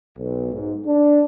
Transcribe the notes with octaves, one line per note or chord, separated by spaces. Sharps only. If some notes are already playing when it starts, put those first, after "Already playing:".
B1
G#2
D4